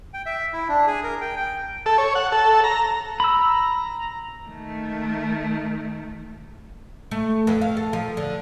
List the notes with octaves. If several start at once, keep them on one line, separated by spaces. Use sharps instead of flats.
G5
E5
E4
D4
G#4
A#4
G5
G5
A4
C#5
F#5
A4
A#5
A#5 B5 E6
D#3 A3
A3
F2
F5
A4
F3
D3